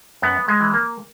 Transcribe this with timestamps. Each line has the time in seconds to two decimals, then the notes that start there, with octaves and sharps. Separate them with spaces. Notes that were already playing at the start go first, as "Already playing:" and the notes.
0.22 F#2 B3
0.48 G#3
0.61 E3
0.74 A#3